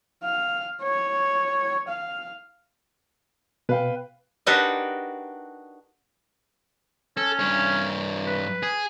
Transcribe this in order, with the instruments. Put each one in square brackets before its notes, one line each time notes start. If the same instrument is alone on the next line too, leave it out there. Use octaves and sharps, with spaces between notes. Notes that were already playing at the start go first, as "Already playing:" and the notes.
[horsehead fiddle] F5
C#5
F5
[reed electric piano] B2 [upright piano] B4 F5 G5
[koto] D4 D#4 F#4 G4 A#4 B4
[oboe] C#4 [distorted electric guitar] A4
[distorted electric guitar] G2 C#5
[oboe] B4
[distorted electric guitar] G#4